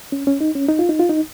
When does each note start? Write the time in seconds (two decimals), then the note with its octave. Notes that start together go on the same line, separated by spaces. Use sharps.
0.12 C#4
0.27 C#4
0.41 D#4
0.55 C#4
0.68 D#4
0.79 F4
0.89 D#4
1.00 F4
1.09 D#4